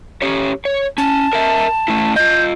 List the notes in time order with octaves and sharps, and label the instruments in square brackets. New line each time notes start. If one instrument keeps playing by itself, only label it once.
[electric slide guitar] C#4 G4 C#5
C#5
[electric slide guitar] C#4 [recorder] A5
[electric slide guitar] A#4 D#5 E5
A3 C#4 E4
[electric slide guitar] F4 D#5 [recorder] G6